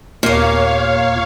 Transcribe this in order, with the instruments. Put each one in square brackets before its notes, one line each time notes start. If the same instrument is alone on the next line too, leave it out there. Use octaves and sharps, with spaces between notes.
[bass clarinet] D#2 [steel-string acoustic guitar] A#2 A#3 [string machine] C#5 F5